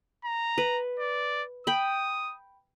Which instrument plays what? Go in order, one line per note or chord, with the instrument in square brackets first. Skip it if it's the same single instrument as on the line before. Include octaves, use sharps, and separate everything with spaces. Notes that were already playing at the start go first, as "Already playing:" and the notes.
[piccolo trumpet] A#5
[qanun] B4
[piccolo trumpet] D5
[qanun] G5 B5 [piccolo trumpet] D#6